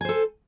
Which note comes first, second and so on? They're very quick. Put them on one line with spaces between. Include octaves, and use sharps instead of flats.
G#5 C5 A4